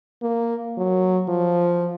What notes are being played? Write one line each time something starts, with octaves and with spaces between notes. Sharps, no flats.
A#3
F#3
F3